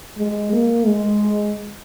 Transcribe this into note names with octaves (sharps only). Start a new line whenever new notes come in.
G#3
A#3
G#3